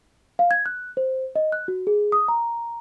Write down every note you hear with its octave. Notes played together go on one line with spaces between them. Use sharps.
F5
G#6
F#6
C5
D#5
F#6
F#4
G#4
D#6
A#5